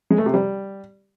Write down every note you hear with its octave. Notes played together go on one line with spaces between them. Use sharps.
G#3
A3
C3
G3